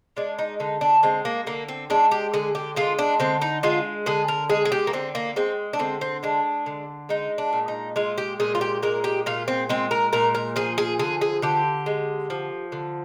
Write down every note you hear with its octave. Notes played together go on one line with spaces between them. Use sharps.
G#3 D4
D#4
D3 D#4
D4
G#3 C4
A#3
D3 A#3
C4
G#3 D4
G4
D3 G#4
G4
G#3 F4
D4
D3 C4
D#4
G#3 F4
D3 G#4
A#4
G#3 G#4
G#4
G4
A#3
D3 C4
A#3
G#3 C4
D4
D3 C4
C4
G#3 D4
D3
G#3 D#4
D4
A#2
D#4
G#3 F4
G4
A#2 G#4
F4
G4
G#3 A#4
G4
A#2 F4
C4
G#3 C4
A#4
A#2 A#4
A#4
F3 G#4
G#4
D3 G#4
G#4
D3 G4
G#3
F3
D3